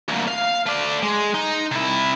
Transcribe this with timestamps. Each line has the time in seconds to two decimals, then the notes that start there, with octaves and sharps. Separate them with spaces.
0.08 D2 A#2
0.27 F5
0.66 A3 D5
1.03 G#3
1.35 D#4
1.71 C3 E4